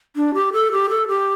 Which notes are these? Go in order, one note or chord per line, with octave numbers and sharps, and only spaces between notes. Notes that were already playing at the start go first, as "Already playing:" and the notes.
D4
G4
A4
G4
A4
G4